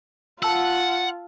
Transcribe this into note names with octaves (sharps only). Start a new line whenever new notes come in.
F4 F#5 A5 E6